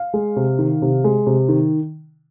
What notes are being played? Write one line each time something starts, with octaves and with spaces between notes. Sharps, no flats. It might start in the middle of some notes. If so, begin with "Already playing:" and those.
Already playing: F5
G#3
C3
D#3
C3
G#3
C3
D#3